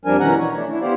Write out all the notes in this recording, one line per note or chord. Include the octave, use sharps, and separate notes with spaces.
F2 F3 G3 D4 A#4 G#5
B2 D#3 E3 C#4 F#5 A#5
C#5
A3 D4
D4 E4
B3 E4 G4 C5 D5 F5